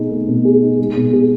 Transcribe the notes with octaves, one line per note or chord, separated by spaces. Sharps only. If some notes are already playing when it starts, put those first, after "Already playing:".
Already playing: B2 A3 D#4 G#4
A3
B2
G#4
D#4
G#3
B2
G#4